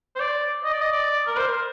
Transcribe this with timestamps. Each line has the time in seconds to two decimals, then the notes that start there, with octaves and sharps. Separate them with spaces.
0.15 C5
0.19 D5
0.64 D#5
0.73 D5
0.81 D#5
0.92 D5
1.27 A#4
1.37 C5
1.47 A#4